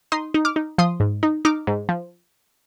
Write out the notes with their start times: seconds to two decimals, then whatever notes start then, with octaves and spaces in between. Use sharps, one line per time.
0.12 D#4 C6 D#6
0.34 D#4
0.45 D6 F6
0.56 D#4
0.78 F3 C6 D#6
1.00 G#2
1.23 D#4
1.45 D#4 D6 F6
1.67 G#2
1.89 F3